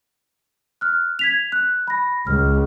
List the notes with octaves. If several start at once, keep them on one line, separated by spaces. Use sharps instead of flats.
F6 F#6
G#6 B6 F7
F#6
B5 A#6
C#2 F6